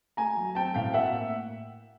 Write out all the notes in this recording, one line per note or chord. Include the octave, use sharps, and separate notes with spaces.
A3 G#5 A#5
F#3
C4 G5 A5
A2 F5 G5
A#3 E5 F#5